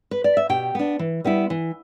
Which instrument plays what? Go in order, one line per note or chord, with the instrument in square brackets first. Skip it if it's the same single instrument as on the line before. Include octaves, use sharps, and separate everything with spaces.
[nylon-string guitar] B4
D5
E5
B2 G4 G5
B3 D4
E3
G3 B3 E4
E3